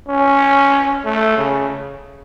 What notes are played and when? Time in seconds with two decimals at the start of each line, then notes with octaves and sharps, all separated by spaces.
0.08 C#4
1.05 A3
1.37 C#3